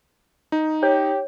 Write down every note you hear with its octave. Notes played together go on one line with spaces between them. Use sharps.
D#4
G4 C#5